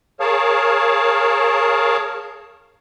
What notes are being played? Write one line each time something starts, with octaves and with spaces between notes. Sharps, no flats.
G#4 A#4 C#5 F5 A5